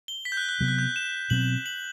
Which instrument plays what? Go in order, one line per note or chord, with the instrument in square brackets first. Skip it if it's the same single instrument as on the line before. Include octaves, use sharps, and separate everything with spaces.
[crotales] G7
B6
G6
F#6
F#6
[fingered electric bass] C3 F#3 B3
[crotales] F#6
G6
E7
[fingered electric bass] B2 F#3 C4 [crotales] F#7
[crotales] F#7